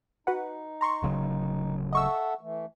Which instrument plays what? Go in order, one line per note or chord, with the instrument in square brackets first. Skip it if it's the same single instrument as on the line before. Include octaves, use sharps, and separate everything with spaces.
[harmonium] D#4 [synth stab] F#4 B4 F#5
[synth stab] A#5 C6 C#6
[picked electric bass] D1 C#3 F#3
[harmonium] A4 E5 F#5 [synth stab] D#5 C#6 E6
[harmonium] E3 A3